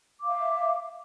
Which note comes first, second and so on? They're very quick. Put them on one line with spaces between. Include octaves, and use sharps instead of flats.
D6 F5 E5